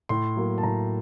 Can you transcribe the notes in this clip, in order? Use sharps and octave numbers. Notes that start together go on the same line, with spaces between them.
A2 C6
F#3 A#3
A5
A2 A#5